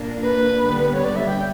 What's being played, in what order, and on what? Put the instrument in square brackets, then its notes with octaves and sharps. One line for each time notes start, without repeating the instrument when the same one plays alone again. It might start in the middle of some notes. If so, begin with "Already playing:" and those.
Already playing: [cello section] A#2 A#3 D4
[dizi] B4
[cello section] D3 G3 B3
[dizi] C#5
D5
E5
G5